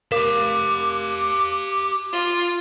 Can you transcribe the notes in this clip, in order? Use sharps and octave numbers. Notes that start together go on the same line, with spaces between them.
G4 A#4 F5 D6
F4